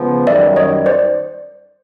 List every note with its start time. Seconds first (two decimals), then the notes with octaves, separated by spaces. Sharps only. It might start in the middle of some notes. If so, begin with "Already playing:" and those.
Already playing: C#3 F3 G#3 B3
0.27 F#2 D#3 G3 D5 E5
0.56 C#5 D#5
0.86 C5 D5